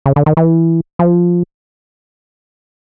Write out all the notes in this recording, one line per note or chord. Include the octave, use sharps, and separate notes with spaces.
C#3
D3
D#3
E3
F3